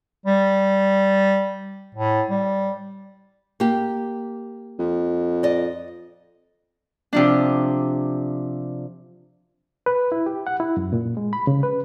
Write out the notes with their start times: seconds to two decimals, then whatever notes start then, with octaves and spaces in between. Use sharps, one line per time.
0.26 G3
1.95 A2
2.30 G3
3.60 A#3 G4
4.79 F2
5.43 D5 D#5
7.13 C3 F3 D4
9.86 B4
10.12 E4
10.26 G4
10.47 F#5
10.60 E4
10.77 F#2
10.93 A#2
11.17 G#3
11.33 B5
11.47 C#3
11.63 B4